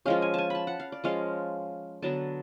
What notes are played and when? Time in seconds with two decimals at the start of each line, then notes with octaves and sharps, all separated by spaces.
0.05 F3 G#3 C#4 F5
0.22 G#5
0.34 G#5 A5
0.50 A5 B5
0.67 F#5
0.80 F5
0.92 D5
1.04 F3 G#3 C#4 F5
2.02 D3 F#3 B3 A5